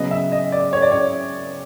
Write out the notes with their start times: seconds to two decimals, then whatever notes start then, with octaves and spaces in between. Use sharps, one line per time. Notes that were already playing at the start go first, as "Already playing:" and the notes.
Already playing: C#3 F#3 B3 D#5
0.11 E5
0.32 D#5
0.52 D5
0.73 C#5
0.82 D5
0.92 C#5